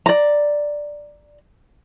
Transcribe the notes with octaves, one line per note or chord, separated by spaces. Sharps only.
D5 A#5